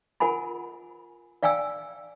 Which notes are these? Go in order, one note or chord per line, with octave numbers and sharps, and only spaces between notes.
F4 A#4 F#5 G#5 B5
D5 F5 G5 G#5 E6